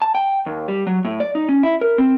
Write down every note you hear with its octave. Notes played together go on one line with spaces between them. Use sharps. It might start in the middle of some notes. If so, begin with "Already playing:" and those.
A5
G5
D#2
G3
F#3
A2
D5
D#4
C#4
E4
A#4
C4